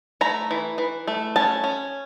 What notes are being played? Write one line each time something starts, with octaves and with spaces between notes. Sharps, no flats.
A3 A#5
E3
E3
A3
C#4 A5
C#4